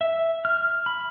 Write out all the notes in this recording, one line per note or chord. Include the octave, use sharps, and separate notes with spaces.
E5
F6
B5